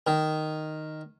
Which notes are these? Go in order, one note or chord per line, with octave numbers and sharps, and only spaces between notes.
D#3